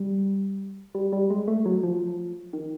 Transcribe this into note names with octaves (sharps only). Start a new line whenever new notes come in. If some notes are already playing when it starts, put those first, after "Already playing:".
Already playing: G3
G3
G3
G#3
A3
F#3
F3
D#3